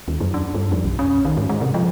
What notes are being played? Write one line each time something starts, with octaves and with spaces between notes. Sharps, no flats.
D#2
F#2
D4
G2
F2
B1
C#4
D#3
G#2
G#3
C3
F3